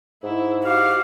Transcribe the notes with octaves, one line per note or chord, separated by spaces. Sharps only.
G#2 E4
F#4 G4 F5